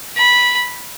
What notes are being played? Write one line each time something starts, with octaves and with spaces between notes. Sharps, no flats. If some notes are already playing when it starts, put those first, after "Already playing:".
B5